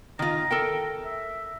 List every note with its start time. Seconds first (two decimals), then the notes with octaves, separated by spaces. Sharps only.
0.19 D#3 F4 A#5
0.51 A4 A#4 G5
1.05 E5